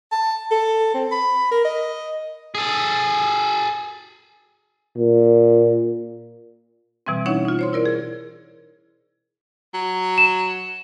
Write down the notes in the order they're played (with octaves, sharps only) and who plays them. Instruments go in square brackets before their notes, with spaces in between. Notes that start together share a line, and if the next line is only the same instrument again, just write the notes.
[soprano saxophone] A5
A4
C4
B5
A#4
D#5
[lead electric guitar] G#4 A4
[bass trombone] A#2
[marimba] B2 E3 G3 C4
C#4 D#4 E4 C#5 F#5
D#4 F4
C5 C#5 C6
E4 A#4 D5
G#4
[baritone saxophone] F#3
[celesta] E7